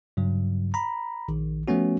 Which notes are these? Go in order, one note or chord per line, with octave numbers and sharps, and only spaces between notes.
G2 C#3 F#3
A#5 B5
A#1 D#3
F3 A3 B3 C#4 F#4